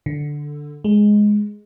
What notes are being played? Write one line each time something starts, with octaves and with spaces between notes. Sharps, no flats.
D3
G#3